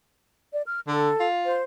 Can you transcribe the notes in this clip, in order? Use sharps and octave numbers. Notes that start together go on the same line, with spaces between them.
D5
F6
D3 A4
F4
C5